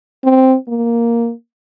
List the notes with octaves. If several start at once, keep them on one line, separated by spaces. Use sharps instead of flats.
C4
A#3